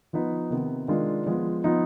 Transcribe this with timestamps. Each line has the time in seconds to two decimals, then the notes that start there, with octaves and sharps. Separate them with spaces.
0.13 F3 B3 D#4 B4
0.50 C3 D#3 B3
0.88 D#3 G#3 D4 F4
1.26 F3 G#3 B3
1.64 F3 B3 D#4